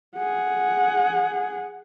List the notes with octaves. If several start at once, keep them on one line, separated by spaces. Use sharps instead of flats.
G#4 F#5